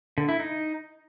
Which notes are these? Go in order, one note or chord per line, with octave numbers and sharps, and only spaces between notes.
D3
E4
D#4